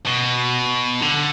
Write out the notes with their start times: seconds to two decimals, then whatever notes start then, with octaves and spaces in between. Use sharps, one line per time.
0.07 B2
1.02 D3